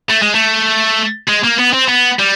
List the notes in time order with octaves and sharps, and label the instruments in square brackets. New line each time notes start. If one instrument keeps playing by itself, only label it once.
[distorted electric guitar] A3
G#3
A3
G#3
A#3
B3
C4
B3
G3